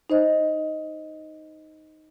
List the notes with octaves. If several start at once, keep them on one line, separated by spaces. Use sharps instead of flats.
D#4 C5 D#5